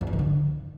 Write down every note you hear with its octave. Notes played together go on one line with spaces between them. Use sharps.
E2
F2
D#3
D3